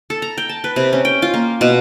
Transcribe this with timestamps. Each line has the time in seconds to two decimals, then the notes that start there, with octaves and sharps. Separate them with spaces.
0.10 A4
0.22 A#5
0.38 G5
0.49 A5
0.64 B4
0.76 C3
0.93 C#4
1.05 G5
1.22 F4
1.34 A#3
1.61 B2